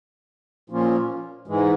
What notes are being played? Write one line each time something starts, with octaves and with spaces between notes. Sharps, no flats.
A#2 F3 A#3 C#4 F4
G#2 E3 G#3